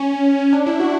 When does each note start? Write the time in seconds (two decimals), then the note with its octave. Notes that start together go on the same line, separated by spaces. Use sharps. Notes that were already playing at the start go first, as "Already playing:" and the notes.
Already playing: C#4
0.53 D4
0.66 E4
0.80 F#4